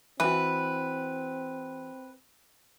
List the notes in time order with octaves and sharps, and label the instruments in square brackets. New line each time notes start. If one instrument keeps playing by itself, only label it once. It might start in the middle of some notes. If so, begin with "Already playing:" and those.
[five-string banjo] E3 F#4 [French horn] C4 [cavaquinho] B4